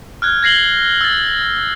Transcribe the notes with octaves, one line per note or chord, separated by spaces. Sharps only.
F6 F#6 G#6
G#6 A#6 C7 F#7 G7
E6 A6